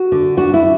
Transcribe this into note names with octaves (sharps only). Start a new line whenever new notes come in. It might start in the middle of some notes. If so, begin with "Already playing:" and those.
Already playing: F#4
D3
D4 F#4
E4